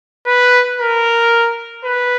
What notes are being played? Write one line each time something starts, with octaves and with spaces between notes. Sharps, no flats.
B4
A#4
B4